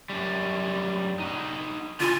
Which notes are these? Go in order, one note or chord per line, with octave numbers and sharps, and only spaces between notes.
F#2 G3
D#4 F#4
D3 F4 G#5